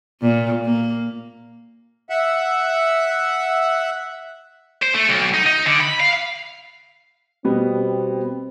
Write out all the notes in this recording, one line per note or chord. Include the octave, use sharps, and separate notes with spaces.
A#2
A#3
E5 F#5
C5
A3
B1
D#4
D#4
D3
B5
F5
B2 G3 B3 C4